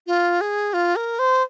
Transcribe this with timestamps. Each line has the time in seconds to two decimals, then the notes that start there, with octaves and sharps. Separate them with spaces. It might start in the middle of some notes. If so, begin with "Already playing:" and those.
0.07 F4
0.41 G#4
0.73 F4
0.96 A#4
1.19 C5